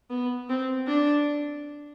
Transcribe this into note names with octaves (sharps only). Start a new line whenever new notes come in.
B3
C4
D4